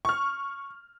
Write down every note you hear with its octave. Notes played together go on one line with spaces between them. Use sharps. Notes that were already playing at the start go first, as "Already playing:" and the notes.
C#6 F6